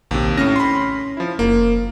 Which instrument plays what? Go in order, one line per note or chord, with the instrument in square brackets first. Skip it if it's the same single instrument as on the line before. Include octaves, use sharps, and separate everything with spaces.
[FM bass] A#1 [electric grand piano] D#2 C3
[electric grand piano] A2 F6 A#6 [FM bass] C#4
[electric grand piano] B5 C6
F3 E4
[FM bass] F#1 [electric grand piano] A#3